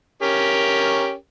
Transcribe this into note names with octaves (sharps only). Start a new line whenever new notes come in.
C#4 G4 A#4